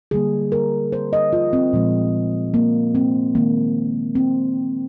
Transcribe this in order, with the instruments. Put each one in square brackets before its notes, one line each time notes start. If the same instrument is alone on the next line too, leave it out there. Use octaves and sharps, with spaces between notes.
[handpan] D3 G3 A#3 G#4
A#4
C5
D#5
F4
C4
A#2 F3 G#3
A#3
C4
D#3 G#3 A#3
C4